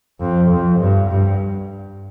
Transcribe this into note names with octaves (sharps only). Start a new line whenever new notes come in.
F2
F2
G2
G2